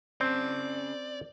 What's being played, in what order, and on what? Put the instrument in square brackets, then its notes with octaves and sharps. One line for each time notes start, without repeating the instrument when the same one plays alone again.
[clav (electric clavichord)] C4 [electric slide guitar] C#4 G#4 A5 [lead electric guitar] D5